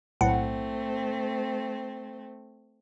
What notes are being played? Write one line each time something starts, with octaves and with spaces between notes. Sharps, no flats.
B1 A2 A3 C4 F#5